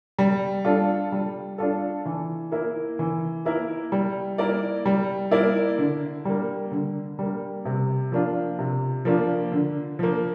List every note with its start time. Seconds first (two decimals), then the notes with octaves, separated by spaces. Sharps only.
0.19 G3
0.65 D4 F4 A4
1.12 G3
1.58 D4 F4 A4
2.05 E3
2.52 A#3 E4 A#4
2.99 E3
3.45 A#3 E4 A#4
3.92 G3
4.38 A#3 E4 A#4 D5
4.86 G3
5.31 A#3 E4 A#4 D5
5.78 D3
6.25 G3 A#3
6.71 D3
7.19 G3 A#3
7.65 C3
8.12 F3 A#3 D4 F4
8.59 C3
9.05 F3 A#3 D4 F4
9.52 D3
9.99 F3 A#3